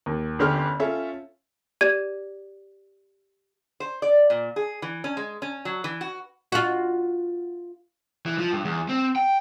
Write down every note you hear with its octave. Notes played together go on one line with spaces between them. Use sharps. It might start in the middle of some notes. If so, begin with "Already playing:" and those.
D#2
G1 D3 C#4 G4 C6 F6
C#4 F4 A4 E5
G4 D5 G#6 D#7
C5
D5
A#2
G#4
E3
C#4
G#3
C#4
F#3
E3
F#4
F4 F#4
E3
F3
G2
E2
C4
G5